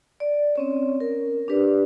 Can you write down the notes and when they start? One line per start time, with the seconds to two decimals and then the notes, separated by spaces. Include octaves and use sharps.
0.20 D5
0.56 C4 C#4 C#5
1.00 A#4
1.48 D4 G4 B4 D5